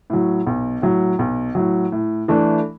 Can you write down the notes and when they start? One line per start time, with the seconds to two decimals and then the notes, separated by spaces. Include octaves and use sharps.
0.10 A2 F#3
0.46 B1
0.82 A2 F#3
1.19 B1
1.55 A2 F#3
1.92 A2
2.28 E3 A3 D4